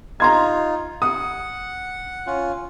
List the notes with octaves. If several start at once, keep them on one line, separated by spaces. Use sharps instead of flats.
D#4 F4 A#5 C6 G#6
F#5 D#6
C#4 F4